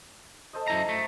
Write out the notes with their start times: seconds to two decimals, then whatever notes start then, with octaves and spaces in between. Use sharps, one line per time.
0.53 A4 C5 D#5
0.68 F#2 E4 A#5
0.89 A3